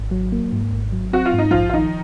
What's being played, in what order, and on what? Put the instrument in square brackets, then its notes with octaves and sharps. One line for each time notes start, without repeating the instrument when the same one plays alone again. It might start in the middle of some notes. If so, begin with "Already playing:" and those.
Already playing: [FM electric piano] G#1
F#3
A#3
G#2
G#1
F#3
[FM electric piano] C4 [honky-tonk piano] F#4
[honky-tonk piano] F4
[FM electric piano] G#2
[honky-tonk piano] D#4
[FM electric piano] A#1 [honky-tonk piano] F3 F4
[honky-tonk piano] F4
[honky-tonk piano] D#3 D#4 [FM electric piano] F3